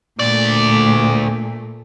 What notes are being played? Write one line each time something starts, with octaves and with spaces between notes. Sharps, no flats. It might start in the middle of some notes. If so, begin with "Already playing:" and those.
D2 A#2 A3 D5